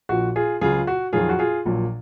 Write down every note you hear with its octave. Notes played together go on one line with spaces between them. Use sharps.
A#1 A#2 F3 F#4
F4 G#4
C#2 C#3 F#3 F4 G#4
F#4
F2 D#3 F#3 F4 G#4
F#4
F4 G#4
A#1 A#2 F#3